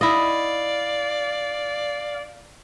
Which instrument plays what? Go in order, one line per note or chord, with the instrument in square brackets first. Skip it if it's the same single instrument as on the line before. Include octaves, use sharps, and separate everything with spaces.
[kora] E4 D#5 [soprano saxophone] D5 [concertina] F5